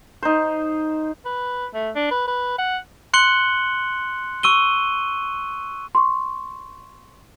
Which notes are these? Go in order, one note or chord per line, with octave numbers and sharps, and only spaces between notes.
D#4 C5
B4
A3
D4
B4
B4
F#5
C6 F#6 C#7 F#7 G7
C#6 E6 D#7 G7
C6 C#6